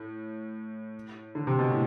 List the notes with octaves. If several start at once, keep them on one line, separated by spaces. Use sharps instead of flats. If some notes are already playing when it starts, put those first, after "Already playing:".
Already playing: A2
D3
C3
B2
A2